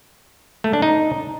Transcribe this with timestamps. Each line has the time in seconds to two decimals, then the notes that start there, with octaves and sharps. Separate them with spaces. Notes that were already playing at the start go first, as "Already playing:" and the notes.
0.64 A3
0.73 D4
0.82 D#4